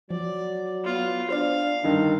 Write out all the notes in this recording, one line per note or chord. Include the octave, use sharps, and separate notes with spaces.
F3 F#3 D5
B3 F4
D4 C5 D5 F5
G2 D3 D#3 D#4